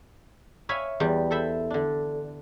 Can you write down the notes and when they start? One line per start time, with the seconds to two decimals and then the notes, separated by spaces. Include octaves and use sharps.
0.69 C#5 E5 F5 G#5 B5
1.00 E2 G3
1.31 A4 C5 E5 B5
1.70 D3 D4